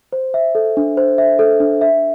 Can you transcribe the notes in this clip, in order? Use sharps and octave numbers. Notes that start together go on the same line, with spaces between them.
C5
E5
A4
D4
C5
E5
A4
D4
E5